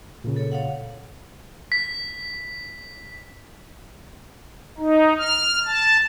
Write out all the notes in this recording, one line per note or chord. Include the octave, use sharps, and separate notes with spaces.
A#2 C#3
A4 C#5
C#5 F5 F#5
B6
D#4
F6
A5